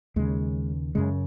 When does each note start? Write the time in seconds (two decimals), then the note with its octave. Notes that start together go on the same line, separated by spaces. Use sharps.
0.16 D#2 C#3 G#3
0.95 F#2 C#3 G#3